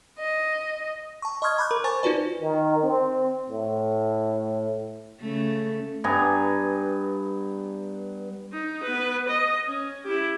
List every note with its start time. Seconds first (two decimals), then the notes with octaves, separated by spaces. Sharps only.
0.19 D#5
1.22 A5 C#6
1.42 D#5 C6 C#6 D#6 F6 G#6
1.58 A#5 B5 C#6 D6 F#6 G6
1.71 A#4
1.84 C5 G#5 A5 C#6 A6
2.03 D#4 F4 F#4 B4 D5
2.42 D#3
2.83 C4
3.50 A2
5.20 C#3 A3
6.04 G2 B3 G#5 A#5
8.53 D#4
8.83 B3 B4
9.28 D#5
9.65 C#4
10.04 E4 G4